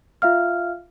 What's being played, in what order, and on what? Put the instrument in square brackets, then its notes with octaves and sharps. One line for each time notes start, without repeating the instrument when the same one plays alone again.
[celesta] F4 E5 F5 F6